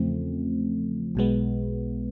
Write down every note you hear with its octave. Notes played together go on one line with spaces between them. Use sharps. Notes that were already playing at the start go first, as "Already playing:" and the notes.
Already playing: E2 C#3 F3 A3 C4
B1 B2 G#3 B3